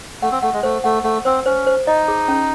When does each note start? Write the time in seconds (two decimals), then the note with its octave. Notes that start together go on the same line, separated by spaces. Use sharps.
0.22 A3 F#5
0.32 C4
0.43 A3 F#5
0.53 G#3
0.63 A3 C5
0.84 A3 F#5
1.04 A3 F#5
1.25 C4 C5
1.46 C#4 C5
1.67 C5
1.87 D#4 D#5
2.08 G#4
2.28 C#4